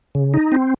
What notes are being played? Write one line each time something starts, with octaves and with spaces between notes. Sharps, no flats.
C#3
D#4
C4